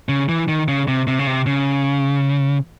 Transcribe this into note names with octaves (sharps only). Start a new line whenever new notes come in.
C#3
E3
D#3
C#3
C3
C3
C#3
C3
C#3